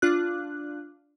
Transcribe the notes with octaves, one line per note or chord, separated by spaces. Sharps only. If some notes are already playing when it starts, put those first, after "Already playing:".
D4 F4 F#6